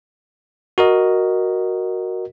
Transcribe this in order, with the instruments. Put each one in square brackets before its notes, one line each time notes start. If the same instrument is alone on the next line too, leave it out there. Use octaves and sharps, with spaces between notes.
[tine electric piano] F#4 A#4 D#5